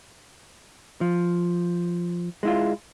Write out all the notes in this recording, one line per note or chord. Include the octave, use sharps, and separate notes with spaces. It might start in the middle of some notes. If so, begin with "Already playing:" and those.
F3
G#3 E4 F4